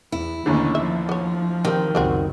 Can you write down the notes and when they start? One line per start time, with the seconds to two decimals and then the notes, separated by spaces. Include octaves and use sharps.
0.12 E2 E4
0.46 A1 D#2 D3 E3 C#4
0.75 F3 E5
1.09 B3 C#5
1.65 D#3 G3 C4
1.95 C#2 F#2 G3 C4 F#4